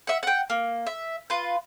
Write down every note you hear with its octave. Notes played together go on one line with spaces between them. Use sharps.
E5 F#5
F#5 G5
A#3
E5
F4 B4